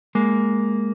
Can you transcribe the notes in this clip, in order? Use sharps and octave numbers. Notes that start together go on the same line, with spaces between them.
G#3 A#3